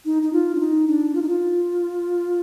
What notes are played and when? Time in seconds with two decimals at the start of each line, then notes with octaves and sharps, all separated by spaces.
0.05 D#4
0.22 D#4
0.33 F4
0.55 D4
0.60 D#4
0.88 D4
1.15 F4
1.22 D#4
1.29 F4